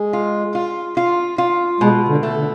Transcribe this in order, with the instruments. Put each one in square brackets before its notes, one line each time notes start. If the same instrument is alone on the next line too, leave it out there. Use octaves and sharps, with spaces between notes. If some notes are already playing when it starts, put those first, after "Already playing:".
Already playing: [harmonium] G#3
[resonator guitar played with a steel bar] F4
F4
F4
F4
[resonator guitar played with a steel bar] B2 [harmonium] G#3
[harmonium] D3
[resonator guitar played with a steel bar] A3
[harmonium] D3